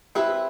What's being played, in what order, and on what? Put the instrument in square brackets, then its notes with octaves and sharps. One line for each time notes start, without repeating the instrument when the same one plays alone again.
[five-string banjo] C4 E4 B4 [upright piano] G4